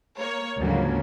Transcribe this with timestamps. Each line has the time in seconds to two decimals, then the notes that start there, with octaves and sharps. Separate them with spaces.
0.19 A#3 C#5
0.59 D2 G#2 C#3 F3 F#3 A#3